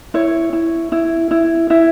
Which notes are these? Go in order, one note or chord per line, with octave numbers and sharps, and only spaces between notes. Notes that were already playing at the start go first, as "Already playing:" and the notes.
E4 C#5
E4
E4
E4
E4 E5